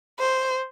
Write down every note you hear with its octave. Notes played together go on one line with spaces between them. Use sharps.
C5